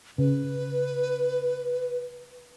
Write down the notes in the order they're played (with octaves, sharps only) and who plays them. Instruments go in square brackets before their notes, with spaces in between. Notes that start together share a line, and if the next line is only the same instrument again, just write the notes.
[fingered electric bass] C#3 [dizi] B4